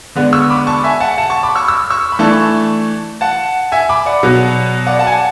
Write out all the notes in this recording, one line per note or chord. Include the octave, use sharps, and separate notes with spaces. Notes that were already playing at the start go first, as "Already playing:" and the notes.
D3 G#3 B3 D4
C#6 E6
B5 D6
A5 C#6
E5 G#5
F#5 A5
F#5 A5
A5 C#6
B5 D6
C#6 E6
E6
C#6 E6
B5
E3 A3 D4 A5 C#6
F#5 A5
E5 G#5
B5 D6
D5 F#5
B2 F#3 B3
D5 F#5
F#5 A5
G#5
F#5 A5